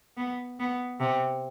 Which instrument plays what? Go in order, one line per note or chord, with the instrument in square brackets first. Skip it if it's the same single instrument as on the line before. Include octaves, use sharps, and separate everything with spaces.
[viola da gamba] B3
B3
C3